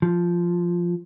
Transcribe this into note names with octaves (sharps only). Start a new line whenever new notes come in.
F3